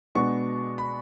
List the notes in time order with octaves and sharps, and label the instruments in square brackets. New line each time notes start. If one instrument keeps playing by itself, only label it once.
[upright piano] B2 G#3 B3 D4 F#4 [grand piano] C#6
[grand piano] B5